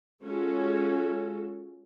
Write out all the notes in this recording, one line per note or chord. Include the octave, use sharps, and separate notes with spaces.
G#3 C#4 F4 F#4 A4